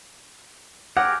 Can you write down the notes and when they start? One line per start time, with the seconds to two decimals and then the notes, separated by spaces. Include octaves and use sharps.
0.97 G4 G#4 A#4 F#5